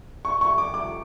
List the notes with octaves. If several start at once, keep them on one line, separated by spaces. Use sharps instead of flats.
C#6
C#6
D6
D6